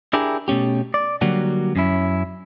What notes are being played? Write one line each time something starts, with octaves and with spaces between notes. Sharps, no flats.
D4 E4 G4 G#4 A#4
B2 A3 C#4 G4
D5
D3 F#3 G3 A#3 F#4
F#2 C#4 E4